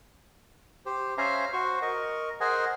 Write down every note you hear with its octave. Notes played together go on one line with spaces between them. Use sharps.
G4 C5
C#4 C5 E5 F5 G#5 A#5
F#4 C5 C#6
A#4 D#5 C#6
G#4 A#4 C5 D#5 F#5 G#5